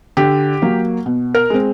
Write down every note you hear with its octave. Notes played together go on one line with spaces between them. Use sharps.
D3 G4
F#3 A#3
B2
A#4
G#3 C4